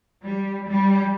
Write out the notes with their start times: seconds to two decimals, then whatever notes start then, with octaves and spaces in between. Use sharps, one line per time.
0.24 G3
0.68 G3